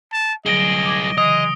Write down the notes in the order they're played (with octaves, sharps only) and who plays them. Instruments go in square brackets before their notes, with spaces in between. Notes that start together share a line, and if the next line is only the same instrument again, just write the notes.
[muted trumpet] A5
[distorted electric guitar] C2 G#4 [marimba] D3 F#3 [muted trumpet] D#5 [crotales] A#6 D7 G7
[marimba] D6 G#6
[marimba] C#3 E3 [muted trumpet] G#3 [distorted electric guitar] D#5 [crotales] D#6